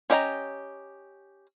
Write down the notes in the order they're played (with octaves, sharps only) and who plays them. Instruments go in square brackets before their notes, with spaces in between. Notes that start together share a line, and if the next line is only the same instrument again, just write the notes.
[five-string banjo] C#4 G4 D#5 F5 A#5